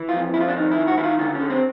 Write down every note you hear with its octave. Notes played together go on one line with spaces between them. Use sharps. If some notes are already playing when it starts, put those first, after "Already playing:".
Already playing: E3
F2 F4
F2 E4
F4
D4
D#3 D#4
E4
D#3
F#4
D#3 E4
F4
D3 F4
C#4
D3
C4